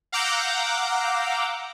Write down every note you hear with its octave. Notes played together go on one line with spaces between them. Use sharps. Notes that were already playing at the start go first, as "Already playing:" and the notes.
F5 F#5 A#5 D6 E6 G6